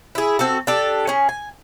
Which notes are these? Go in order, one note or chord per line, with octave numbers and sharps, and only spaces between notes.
E4 G#4
C4 F#4 A4
D4 G4 A4
C#4 G#4
G#5